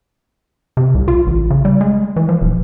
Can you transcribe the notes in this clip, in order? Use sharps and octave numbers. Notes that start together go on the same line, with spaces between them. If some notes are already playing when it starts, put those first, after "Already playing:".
C3
C2
F4
A1
C#3
G3
G#3
E3
F3
D#1